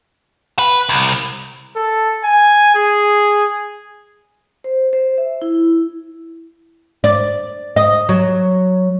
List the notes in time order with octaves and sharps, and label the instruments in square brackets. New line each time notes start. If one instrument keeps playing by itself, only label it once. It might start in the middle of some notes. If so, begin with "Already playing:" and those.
[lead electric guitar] B4
C2
[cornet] A4
G#5
G#4
[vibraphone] C5
C5
E5
E4
[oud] D5
D#5
F#3